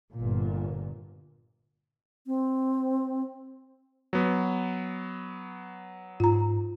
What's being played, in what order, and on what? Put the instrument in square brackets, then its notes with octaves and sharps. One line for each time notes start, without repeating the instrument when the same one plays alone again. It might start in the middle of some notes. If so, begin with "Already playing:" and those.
[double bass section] G1 A#2
[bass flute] C4
[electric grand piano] F#3 B3
[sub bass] G#2 [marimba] F4 A#5